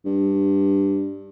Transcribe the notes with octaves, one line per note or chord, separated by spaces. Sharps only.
G2